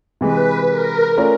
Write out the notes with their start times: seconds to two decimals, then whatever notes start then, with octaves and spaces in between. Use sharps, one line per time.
0.20 C3 E3 G#3 B4
0.69 A#4
1.17 A3 C#4 F4 A#4 D5